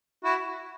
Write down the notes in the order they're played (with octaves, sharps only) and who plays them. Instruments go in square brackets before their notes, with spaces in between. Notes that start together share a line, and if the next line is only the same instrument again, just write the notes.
[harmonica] E4 F#4